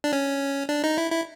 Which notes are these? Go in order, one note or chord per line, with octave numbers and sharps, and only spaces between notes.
D4
C#4
D4
D#4
E4
E4